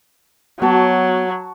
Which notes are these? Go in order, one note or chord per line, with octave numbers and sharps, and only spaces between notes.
F#3 B3 F#4 C#5 A5